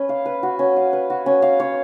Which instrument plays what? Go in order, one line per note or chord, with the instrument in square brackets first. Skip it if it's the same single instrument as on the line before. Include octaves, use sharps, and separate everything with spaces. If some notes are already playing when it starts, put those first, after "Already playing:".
Already playing: [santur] C#4 B4
F5
B4
F#4
C#4
F5
B4
F#4
C#4
F5
C#5